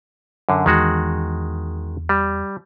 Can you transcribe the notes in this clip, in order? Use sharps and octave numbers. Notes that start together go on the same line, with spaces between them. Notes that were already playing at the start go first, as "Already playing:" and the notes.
F#2 D3
E2 D#3 G#3 F#4
G3